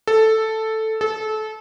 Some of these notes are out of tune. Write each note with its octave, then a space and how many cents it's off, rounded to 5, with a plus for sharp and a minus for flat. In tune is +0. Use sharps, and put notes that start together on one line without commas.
A4 +0
A4 -25